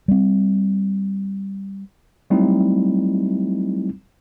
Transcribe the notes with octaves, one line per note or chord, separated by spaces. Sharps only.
G3 C4
F#3 G3 A3 C4 D#4 E4